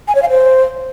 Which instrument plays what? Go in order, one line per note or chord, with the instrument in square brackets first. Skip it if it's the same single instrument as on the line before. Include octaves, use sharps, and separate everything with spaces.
[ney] G#5
C#5
F5
C5